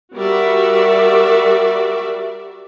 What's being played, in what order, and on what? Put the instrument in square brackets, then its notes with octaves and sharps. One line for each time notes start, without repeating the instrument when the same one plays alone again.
[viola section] G3 F#4 A#4 D5 E5